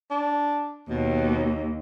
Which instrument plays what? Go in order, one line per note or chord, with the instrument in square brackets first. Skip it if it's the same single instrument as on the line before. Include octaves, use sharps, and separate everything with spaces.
[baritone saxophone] D4
[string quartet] D#2 [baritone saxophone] B2